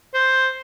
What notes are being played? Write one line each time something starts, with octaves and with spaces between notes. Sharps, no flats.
C5